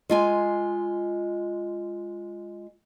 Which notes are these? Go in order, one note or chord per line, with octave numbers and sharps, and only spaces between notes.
G#3 F4 G#5